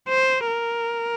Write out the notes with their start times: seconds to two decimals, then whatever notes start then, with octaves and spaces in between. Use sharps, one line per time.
0.09 C5
0.47 A#4